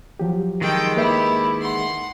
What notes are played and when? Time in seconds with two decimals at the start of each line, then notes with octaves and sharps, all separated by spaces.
0.19 F3 F#3 G4
0.61 D#3 G#3 A4 G5
0.96 A#3 E4 G4 B4 E5
1.61 F#5 C6